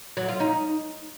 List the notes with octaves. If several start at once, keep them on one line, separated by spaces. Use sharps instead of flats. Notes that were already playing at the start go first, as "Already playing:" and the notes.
F#3
F4
D#4